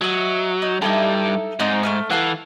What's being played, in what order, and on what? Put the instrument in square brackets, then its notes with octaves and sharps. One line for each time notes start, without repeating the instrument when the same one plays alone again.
[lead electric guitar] F#3 [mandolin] D#5 E5
[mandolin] D#4
[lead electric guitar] G2 G3 [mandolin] D#4 E4 A4
[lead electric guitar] G#2 [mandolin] C4 D#4 D5
[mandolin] A3 D#4 F6
[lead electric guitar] E3 [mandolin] A4 F5 F#5